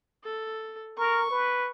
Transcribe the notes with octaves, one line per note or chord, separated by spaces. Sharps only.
A4
A#4 C#6
B4